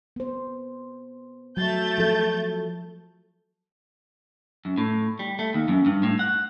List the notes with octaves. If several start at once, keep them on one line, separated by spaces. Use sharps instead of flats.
B3 C5
F#3 A3 G6 A6
F3 A4
F#2
A2
G3
A3
D#2
F#2
G2
A2
F#5